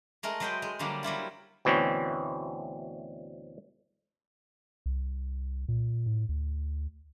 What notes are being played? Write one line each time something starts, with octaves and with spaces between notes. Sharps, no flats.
G#3 A3 A#4
F#3 G#3 B4 C5 D#5 G5
G#3
D3 F#3 G3 A#3 D4
F#3 G3 E4 F4
D2 B2 E3 C4 C#4
C2
A#2
A2
D2